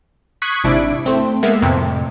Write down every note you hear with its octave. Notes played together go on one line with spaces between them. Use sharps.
C#6 D#6 F#6 G#6 B6 C7
G#1 C3 D4 E4 D7
A3 C4
G#3 A#3 B3 E5
F2 A2 C3